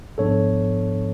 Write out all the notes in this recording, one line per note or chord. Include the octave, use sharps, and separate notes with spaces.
G#2 F3 B3 D4 A4 C#5